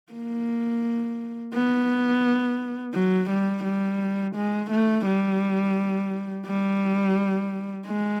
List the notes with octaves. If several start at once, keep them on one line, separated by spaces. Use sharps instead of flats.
A#3
B3
F#3
G3
G3
G#3
A3
G3
G3
G#3